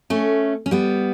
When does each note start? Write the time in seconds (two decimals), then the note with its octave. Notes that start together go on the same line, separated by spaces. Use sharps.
0.10 A3 C#4
0.66 C#4
0.71 G3 B3